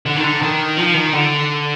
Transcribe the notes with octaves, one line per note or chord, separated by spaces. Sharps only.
D3
D#3
D3
D#3
F3
D#3
D3